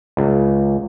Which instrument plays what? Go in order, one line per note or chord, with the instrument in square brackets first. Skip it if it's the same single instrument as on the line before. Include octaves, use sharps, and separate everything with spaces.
[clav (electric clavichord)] C#2